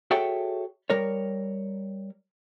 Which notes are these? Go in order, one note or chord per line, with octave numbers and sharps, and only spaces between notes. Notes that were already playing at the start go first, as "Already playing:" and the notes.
F#4 G#4 A4 C#5 E5 G5
G3 A#4 C#5